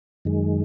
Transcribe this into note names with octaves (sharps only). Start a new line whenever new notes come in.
F#2 D#3 G#3